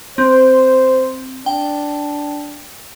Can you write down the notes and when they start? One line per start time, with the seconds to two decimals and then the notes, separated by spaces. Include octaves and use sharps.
0.18 C4 C5
1.46 D4 G5